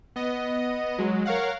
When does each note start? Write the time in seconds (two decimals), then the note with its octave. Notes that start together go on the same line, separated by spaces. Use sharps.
0.16 B3 D#5
0.98 F#3 G#3
1.25 A#4 C#5 F5 F#5